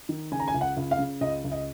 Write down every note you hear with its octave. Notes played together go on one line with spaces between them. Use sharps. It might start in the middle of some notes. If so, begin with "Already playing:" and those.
D#3
C#3 G#5
A#5
G#5
C#2
F#5
C#2
F5
C#3
C#2 D#5
C#2
D#5